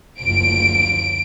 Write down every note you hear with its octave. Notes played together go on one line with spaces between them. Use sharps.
F#1 D2 F3 D7